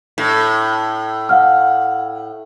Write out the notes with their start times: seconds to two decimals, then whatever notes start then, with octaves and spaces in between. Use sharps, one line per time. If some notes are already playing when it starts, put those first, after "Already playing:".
0.18 A2
1.29 F5 F#5 F6